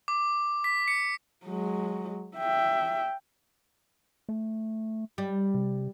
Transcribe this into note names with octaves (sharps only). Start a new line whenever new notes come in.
D6
B6
C#7
F#3 G#3
E5 G5
A3
G3
C3